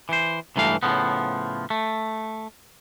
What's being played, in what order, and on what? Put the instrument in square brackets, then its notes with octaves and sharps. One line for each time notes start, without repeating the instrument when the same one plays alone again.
[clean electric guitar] E3 C5
C#2 G2 E3 A3 F5
A2 C#3 F3 B3
A3